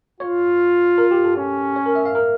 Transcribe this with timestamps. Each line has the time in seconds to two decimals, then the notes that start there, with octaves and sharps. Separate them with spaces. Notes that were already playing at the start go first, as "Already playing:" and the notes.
0.20 F4 C#5
0.98 A#4
1.11 G4
1.24 A4
1.36 C#4
1.76 C#5
1.86 A#4
1.95 E5
2.05 F5
2.15 A#4